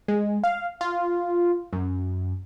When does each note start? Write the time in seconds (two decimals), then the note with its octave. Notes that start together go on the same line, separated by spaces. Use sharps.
0.08 G#3
0.44 F5
0.81 F4
1.73 F#2